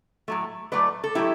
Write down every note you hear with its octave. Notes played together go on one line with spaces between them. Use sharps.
A2 F#3 A3
A2 F#3 A3 B4 D5
A4
A2 F#3 A3 E4 G4